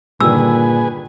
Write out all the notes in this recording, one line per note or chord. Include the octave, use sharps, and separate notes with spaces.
G2 A#2 D3 D#3 G#4 B4 G#5 E6